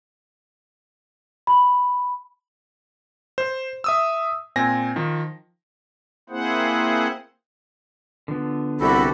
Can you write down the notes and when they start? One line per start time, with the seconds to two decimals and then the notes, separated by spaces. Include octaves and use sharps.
1.47 B5
3.38 C5
3.84 E5 D#6 E6
4.56 A#2 C4 G#5 A#6
4.96 D#3 F3
6.30 A#3 C4 E4 G#4 C5 F#5
8.28 D3 F3 B3
8.80 C2 F#4 G4 A4 B5